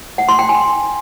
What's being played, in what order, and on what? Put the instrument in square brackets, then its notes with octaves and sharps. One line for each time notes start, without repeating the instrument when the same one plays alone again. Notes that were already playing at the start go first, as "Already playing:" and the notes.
[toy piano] F#5
C6
G5
G#5